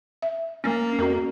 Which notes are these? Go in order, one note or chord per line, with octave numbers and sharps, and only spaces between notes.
E5
A#3 C#4
F2 C#4 F#4 A#4